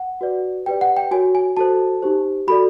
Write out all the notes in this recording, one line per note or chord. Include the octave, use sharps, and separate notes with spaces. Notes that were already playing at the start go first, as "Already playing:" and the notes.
Already playing: F#5
F#4 B4 D5
G4 B4 D5 G5
F#5
G5
F#4 A#4 C#5 G#5
G#5
F#4 A4 C5 A5
D#4 G4 C5
F#4 A4 D5 B5